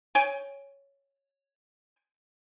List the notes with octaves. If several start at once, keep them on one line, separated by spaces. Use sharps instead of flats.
C#5 G5 G#5